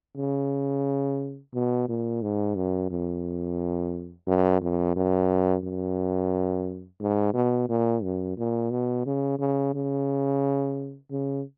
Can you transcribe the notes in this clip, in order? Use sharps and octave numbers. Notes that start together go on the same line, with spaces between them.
C#3
B2
A#2
G#2
F#2
F2
F#2
F2
F#2
F#2
G#2
B2
A#2
F#2
A#2
B2
C#3
C#3
C#3
C#3